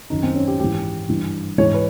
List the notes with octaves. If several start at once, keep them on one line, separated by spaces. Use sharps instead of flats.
F#2 D#3 D#4
C4
C#4
G4
G#2 E3 G4
G2 E3
G#2 E3 C#5
B4